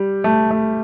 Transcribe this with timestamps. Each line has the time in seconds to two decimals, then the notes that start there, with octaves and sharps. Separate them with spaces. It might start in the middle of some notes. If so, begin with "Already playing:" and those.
Already playing: G3
0.24 A3
0.51 A3